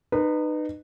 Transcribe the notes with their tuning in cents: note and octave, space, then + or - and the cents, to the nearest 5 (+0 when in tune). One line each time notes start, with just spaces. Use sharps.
D#4 -30 B4 +0